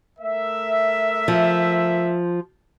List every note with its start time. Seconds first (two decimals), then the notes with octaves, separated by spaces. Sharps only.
0.20 A3 A#4 E5
1.28 F3